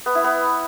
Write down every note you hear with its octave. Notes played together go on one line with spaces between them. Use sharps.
B3
E4
B3